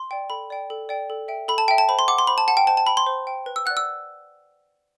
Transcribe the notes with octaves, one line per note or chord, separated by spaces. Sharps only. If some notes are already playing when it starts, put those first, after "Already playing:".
Already playing: C6
D5 G5
A4 B5
D5 G5
A4
D5 G5
A4
E5 G5
A4 B5
A5
E5 G5
A5
C5 B5
C6
F#5 D6
C6
C5 B5
A5
F#5 A5
G5
C5 A5
A5
G5 B5
C6
C5
G5
B4
E6
D5 F#5 F#6
E6